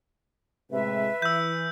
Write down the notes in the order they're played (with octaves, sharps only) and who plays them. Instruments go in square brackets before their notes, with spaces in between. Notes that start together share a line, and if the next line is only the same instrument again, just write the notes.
[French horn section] A2 C3 G#3 [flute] B4 [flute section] E5
[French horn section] E3 [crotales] E6 G6